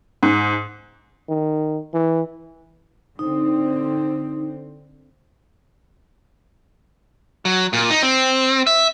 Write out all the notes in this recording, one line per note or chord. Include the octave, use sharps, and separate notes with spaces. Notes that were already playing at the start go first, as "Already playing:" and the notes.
G#2
D#3
E3
D3 C4 D#4
F#3
A#2
D#4
C4
E5